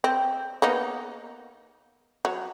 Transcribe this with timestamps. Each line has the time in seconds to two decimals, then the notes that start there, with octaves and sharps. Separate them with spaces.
0.04 C4
0.62 A#3 B3 D#4
2.25 F#3